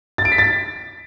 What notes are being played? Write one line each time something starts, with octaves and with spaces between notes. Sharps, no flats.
A6
D7
B6
A6